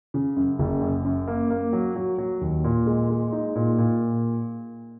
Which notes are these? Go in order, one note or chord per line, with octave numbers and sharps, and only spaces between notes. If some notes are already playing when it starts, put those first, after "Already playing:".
C#3
F#2
F#1
F#2
F#2
A#3
A#3
F#3
F#3
F#3
D#2
A#2
G#3
G#3
D#4
A#2
A#2